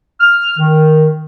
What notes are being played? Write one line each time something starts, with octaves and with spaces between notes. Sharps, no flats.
F6
D#3